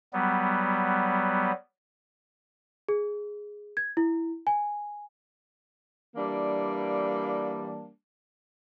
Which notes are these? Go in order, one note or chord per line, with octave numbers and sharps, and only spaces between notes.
F#3 G3 B3
G#4
G#6
E4
G#5
E3 G3 A#3 D4